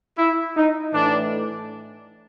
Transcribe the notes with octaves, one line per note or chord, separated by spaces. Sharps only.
E4
D#4
A2 E3 A3 D4